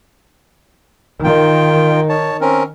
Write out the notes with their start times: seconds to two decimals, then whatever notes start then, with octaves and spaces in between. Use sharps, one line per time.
1.24 D#3 F4 G5
2.09 C#5 A5
2.41 C4 C#4 A#4